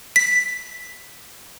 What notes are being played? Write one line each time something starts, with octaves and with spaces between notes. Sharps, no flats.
B6